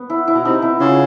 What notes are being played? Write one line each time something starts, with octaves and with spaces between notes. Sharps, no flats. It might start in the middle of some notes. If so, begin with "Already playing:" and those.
Already playing: B3
E4
E4
B2
C3 D#4
E4
C#3 F4